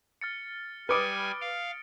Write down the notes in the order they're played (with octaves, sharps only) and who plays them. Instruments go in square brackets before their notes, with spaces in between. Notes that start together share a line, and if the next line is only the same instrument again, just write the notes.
[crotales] F6 A6 C#7
[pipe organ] G3 G#5 [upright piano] B4 D6 D#6 [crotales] F6 C#7 D7
[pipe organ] F5 [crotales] D7